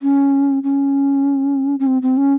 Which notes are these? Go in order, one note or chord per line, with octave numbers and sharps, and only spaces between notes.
C#4
C#4
C#4
C4
C4
C#4